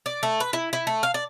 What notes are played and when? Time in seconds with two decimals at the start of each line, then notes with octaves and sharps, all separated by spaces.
0.06 D5
0.23 A3
0.40 B4
0.53 E4
0.73 E4
0.87 A3
1.03 F5
1.14 D5